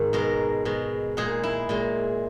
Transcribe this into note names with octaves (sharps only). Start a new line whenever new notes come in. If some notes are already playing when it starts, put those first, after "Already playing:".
Already playing: G#2 D#3
B2 G#3 A#4
B2 G#3
A#2 G#3 G#4
E4
A#2 G#3